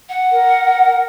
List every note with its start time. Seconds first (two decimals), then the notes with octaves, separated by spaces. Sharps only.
0.09 F#5
0.32 A#4